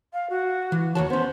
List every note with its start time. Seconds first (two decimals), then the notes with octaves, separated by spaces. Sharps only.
0.13 F5
0.30 F#4
0.72 E3
0.95 D#2 F#4 C#5 A5
1.10 B3 C#4 C5